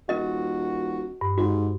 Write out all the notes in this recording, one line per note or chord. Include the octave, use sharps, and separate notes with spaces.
D#1 F#4 A#4 D#5
G2
G#2 F#4